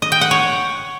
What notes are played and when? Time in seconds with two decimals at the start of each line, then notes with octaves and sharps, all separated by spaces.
0.02 D#5
0.12 G5
0.21 F#5
0.31 C#5